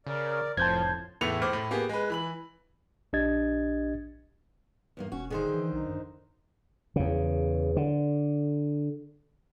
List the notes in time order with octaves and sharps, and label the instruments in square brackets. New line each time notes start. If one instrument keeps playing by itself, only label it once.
[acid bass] C#3 [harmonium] A#4 D5
[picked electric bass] F1 [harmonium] A2 C5 [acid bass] F3 [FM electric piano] A5 G6 G#6
[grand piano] E2 A2 A3 E4 C#7 F7
A2 C5 D6 F6
A2
A#3 B3 G4 G#4
G#3 B4
E3 B5 F#7
[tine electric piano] A#1 D4 G4 D#5 G#6 A6
[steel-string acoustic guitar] E2 G2 A#3
[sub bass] E1 [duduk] C#4 [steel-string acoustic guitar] F#4
[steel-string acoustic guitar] D3 D#3 C5 [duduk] G#4
[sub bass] E3
[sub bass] B1 [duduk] D#4
[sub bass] F#2
[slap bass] E2 C#3
D3